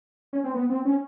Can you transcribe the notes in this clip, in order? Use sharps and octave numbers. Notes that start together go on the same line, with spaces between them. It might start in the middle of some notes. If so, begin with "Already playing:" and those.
C#4
C4
B3
C4
C#4